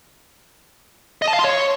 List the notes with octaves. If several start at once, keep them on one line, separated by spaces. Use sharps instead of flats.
D#5
A5
F5
C6
C#5